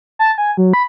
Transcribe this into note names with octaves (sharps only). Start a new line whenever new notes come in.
A5
G#5
F#3
B5